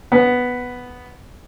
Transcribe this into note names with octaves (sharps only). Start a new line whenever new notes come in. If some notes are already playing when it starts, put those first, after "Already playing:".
B3